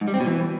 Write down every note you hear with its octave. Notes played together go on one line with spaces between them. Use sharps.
G#2
G3
C4
B2
E3